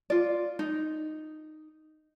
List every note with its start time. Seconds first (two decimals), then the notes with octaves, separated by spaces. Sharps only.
0.10 F4 D5
0.59 D#4